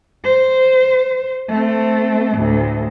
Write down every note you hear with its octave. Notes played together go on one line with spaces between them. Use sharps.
C5
A3 C4
D2 A2